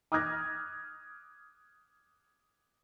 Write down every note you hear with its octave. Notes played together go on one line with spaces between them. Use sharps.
D6 D#6 F6 F#6 G#6 A#6